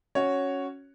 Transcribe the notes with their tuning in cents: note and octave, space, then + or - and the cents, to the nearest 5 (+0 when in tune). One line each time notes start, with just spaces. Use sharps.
C#4 +0 F#4 +0 C#5 +0